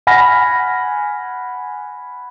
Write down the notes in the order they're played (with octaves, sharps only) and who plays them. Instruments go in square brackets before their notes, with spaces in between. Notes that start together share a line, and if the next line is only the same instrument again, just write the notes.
[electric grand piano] F#5 G#5 B5 F6 A#6